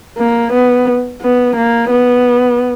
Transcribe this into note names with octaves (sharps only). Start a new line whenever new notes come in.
A#3
B3
B3
A#3
B3